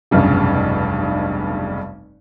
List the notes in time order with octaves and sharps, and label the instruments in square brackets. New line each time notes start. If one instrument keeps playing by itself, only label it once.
[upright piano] F1 B1 G2 C#3